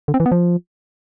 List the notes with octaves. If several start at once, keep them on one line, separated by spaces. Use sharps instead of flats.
D3
C4
E3
B3
F3